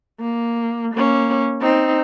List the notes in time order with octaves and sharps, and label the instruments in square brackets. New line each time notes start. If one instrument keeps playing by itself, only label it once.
[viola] A#3
A#3 C#4
C4 D#4